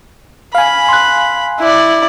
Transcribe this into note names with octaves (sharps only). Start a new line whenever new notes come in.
F5 G#5 B5
C6 F#6
E4 D5